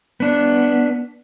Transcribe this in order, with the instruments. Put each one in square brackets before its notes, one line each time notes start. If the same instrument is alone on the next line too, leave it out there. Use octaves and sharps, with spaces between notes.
[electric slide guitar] B3 D4